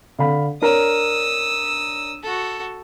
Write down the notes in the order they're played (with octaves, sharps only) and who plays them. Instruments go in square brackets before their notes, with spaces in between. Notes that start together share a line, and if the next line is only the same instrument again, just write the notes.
[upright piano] D3 F5 B5
[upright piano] D4 A#4 C#5 [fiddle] D#6 E6
[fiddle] F#4 A4